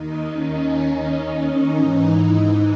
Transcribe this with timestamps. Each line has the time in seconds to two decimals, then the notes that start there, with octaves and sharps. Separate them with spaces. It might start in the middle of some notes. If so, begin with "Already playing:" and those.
Already playing: D#2 D#3 D#4
0.31 C#4
1.73 G#2 E3 D#4